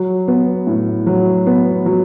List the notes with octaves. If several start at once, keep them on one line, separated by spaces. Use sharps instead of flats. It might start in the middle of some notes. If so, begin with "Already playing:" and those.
Already playing: F#3
B3
A2
F#3
B3
F#3